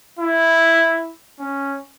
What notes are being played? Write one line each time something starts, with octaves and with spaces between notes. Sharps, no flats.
E4
C#4